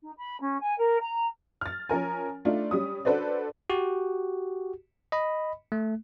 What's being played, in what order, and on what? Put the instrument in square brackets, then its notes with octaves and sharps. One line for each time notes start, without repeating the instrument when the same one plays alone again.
[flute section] D#4
B5
C#4
G#5
A#4
A#5
[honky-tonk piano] F6 A6
F3 C#4 A#4 G#5
A3 D4 D#4 F4
G3 C#4 D#6
D4 F#4 A4 B4 C5 D5
[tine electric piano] F#4 G4
D#5 B5
A3